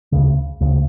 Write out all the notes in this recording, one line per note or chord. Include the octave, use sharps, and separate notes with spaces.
D2 C#3
D2 C#3